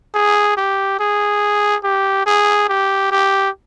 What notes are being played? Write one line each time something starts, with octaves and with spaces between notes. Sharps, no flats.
G#4
G4
G#4
G4
G#4
G4
G4